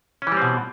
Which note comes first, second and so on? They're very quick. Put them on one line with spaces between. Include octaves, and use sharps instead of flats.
C#4 E3 G3 C4 B2